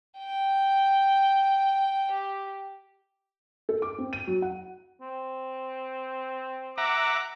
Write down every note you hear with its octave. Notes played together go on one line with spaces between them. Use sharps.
G5
G4
A4
D6
C4
D#7
F#3
F#5
C4
E5 F#5 A#5 D6